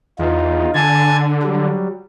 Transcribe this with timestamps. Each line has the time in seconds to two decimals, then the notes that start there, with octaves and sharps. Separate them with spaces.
0.19 E2 D#4 F4
0.74 D3 G#5 A5 G#6
1.43 F#3 G3